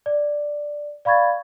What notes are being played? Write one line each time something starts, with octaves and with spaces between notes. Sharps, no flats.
D5
D5 F5 B5 C#6 G#6 A6